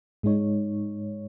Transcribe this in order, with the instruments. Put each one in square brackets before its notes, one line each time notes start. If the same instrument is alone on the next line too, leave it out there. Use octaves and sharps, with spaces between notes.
[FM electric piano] G#2 G#3 D#4 C#5